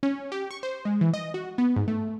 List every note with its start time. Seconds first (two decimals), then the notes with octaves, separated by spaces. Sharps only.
0.03 C#4
0.32 G4
0.51 C#6
0.63 C5
0.85 G#3
1.01 E3
1.14 D#5
1.34 F#4
1.58 B3
1.76 G#2
1.88 A3